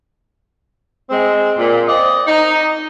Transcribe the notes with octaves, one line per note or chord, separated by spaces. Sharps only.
G#3 C4
A#2
C4 D5 D#5
D#4